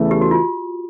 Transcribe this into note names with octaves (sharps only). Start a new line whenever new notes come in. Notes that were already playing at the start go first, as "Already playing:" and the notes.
Already playing: E2 C#3 E3 A3
G4
F#4
F4